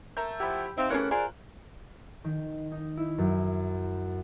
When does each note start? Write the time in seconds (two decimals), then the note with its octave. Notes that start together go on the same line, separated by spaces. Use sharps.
0.17 A3 A#4 E5 E6 G6
0.40 F3 E4 G4 F#5 G5 B5
0.78 C4 D#4 G4 E5 F5
0.90 E3 A3 C#4 G4 G#4 A#4 C#5 F#6
1.11 F4 G#4 A#4 C5 D5
2.24 D#3
2.72 D#4
2.97 E4
3.18 F#2